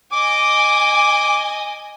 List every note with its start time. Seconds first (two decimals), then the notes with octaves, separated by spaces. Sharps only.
0.12 D#5 G#5 D6